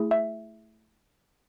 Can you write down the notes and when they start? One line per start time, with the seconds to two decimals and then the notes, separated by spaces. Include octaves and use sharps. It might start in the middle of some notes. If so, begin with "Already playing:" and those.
Already playing: A3 E4 G#4
0.11 E5